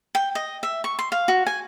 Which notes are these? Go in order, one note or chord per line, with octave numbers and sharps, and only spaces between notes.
G5
D#5
E5
C#6
C6
F5
F#4
G#5